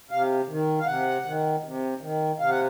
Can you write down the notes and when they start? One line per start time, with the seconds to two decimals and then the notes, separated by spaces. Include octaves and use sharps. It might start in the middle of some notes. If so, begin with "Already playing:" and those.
0.11 C3 F5
0.49 D#3
0.79 F5
0.87 C3 F#5
1.25 D#3
1.64 C3
2.01 D#3
2.39 C3 F5
2.50 F#5